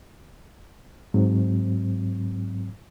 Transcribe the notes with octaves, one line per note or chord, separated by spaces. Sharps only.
G#2 F#3 C4